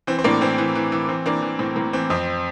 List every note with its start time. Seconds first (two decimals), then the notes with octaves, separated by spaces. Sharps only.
0.07 E3 C4
0.19 C4
0.24 A2 A#3 D4
0.41 E3 C4
0.58 E3
0.75 E3
0.92 E3
1.09 E3 C4
1.25 E3 A#3 D4
1.42 E3
1.59 A2 C4
1.76 A2 A#3
1.93 E3 C4
2.10 F2 C4